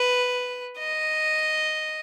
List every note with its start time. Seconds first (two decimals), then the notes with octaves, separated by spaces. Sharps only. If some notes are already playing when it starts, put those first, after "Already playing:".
Already playing: B4
0.78 D#5